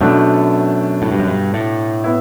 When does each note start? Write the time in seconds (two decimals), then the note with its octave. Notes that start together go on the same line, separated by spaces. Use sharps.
0.01 F#2 B2 A3 D4
1.02 A2
1.12 G2
1.19 F#2
1.27 G2
1.54 A2
2.04 B3 E4